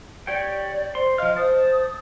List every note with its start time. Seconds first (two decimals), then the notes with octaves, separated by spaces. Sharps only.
0.27 G4 C#5 D5 G5
0.95 C5 C6
1.18 F3 D#5 F5 F6
1.37 C5 A5 D#6